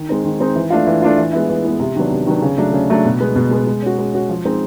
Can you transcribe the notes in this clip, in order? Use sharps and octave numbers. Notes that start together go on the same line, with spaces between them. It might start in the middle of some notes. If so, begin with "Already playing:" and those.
Already playing: D#3
G#3 C4 D#4
D#3
G#3 C4 D#4
E3
A3 D4 F4
E3
A3 D4 F4
E3
G#3 B3 E4
E3
G#3 B3 E4
C3
D#3 F#3 B3 D4
C3
D#3 F#3 B3 D4
C#3
F#3 A3 D4
C#3
F#3 A3 D4
B2
G#3 B3
B2
G#3 B3
G#3
C#4 F#4
G#3
C#4 F#4
F3
G#3 C4 D#4